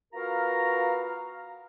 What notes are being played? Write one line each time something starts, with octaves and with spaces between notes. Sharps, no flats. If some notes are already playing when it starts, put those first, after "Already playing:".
B3 F4 F#4 A#4 F5 A#5